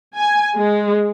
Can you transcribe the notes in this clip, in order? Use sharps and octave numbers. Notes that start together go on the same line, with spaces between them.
G#5
G#3